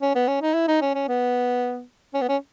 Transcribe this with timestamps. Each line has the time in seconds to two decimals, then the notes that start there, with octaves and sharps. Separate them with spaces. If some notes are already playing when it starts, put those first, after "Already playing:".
0.02 C#4
0.15 B3
0.28 C#4
0.42 D#4
0.54 E4
0.68 D#4
0.81 C#4
0.95 C#4
1.08 B3
2.14 C#4
2.21 B3
2.29 C#4